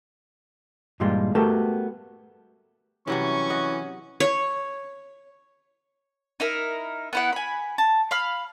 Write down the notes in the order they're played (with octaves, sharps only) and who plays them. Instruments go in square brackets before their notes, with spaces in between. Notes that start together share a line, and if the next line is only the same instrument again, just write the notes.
[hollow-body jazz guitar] G2 A#2 E3 G3 G#3 F4
A3 B3 F#4 G4 A4 A#4
[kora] C3 F#3 G3 [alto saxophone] E3 [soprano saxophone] C#4 [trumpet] C#6
[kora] F#4 D#5 F#5
[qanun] C#5
[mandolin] D#4 E4 A#4
B3 E4 F#5
G#5 B5
A5
F5 B5 F6